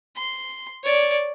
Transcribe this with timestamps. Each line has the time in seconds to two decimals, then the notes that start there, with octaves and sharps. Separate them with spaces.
0.16 C6
0.83 C#5 D5